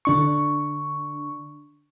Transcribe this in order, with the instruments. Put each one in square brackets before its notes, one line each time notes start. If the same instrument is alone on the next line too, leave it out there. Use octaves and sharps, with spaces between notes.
[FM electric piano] D3 D4 C#6